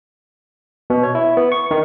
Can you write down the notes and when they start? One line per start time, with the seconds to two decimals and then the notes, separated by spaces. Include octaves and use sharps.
0.90 B2
1.03 C#5
1.15 E4
1.37 B3
1.52 C#6
1.71 D#3